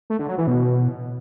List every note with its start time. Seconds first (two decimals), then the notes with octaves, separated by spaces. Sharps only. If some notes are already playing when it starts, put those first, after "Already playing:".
0.10 A3
0.19 D3
0.29 F#3
0.38 E3
0.47 B2